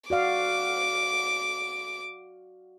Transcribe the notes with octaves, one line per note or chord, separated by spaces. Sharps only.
F#4 D5 F5 D6